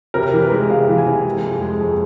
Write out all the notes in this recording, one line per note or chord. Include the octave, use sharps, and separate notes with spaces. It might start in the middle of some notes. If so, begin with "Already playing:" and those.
C3 A#4
E3
B4
G#3
C3 F5
E3
G#5
C3
G#3
F2
G#3
F2